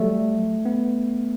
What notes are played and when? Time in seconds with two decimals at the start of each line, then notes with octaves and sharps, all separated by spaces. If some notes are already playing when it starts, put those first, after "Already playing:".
Already playing: F#3 G3 A3
0.66 B3